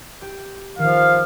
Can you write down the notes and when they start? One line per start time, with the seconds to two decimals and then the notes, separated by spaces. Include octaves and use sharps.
0.21 G4 G6
0.79 D#3 F3 F5